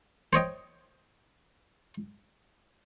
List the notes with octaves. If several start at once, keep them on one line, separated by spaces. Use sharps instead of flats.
C5 C#5 D#5 G5